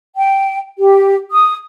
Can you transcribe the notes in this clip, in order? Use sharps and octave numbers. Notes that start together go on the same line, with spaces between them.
G5
G4
D#6